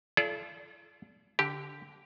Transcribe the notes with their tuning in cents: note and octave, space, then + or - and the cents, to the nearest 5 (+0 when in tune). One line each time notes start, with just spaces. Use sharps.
F4 -45 A4 -35 D5 -25
D3 -15 G4 +0